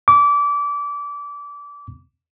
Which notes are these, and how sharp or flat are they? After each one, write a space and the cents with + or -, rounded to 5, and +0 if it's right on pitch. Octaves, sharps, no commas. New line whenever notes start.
D6 -25